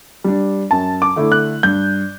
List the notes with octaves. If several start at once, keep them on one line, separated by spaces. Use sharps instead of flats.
G3 D4
F#2 A5
D6
D3 A3 E4
F#6
G2 G6